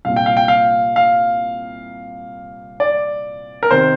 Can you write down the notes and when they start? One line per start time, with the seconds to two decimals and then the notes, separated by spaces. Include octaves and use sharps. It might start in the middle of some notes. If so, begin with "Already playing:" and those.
0.05 C2 A#2 F5
0.16 G5
0.26 F5
0.37 G5
0.48 F5
0.96 F5
2.80 D5
3.63 A#4
3.71 C3 D#3 C5